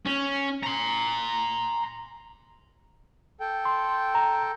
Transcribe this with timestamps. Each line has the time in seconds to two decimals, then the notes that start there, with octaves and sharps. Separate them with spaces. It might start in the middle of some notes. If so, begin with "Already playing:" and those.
0.06 C#4
0.64 A#5 C6
3.40 A4 G5
3.65 C6
4.15 A#5